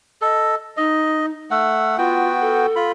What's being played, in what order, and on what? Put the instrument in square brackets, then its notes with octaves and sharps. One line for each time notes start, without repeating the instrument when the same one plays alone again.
[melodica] A4 [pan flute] D#5
[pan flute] D#4 [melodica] D#5
[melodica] A3 F#5 [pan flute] E6
[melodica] B3 F#4 G5 [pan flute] F4
[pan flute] A4
[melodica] F4 B5